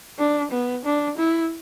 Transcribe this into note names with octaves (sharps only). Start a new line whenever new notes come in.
D4
B3
D4
E4